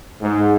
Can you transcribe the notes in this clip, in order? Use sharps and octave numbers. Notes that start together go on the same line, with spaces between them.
G#2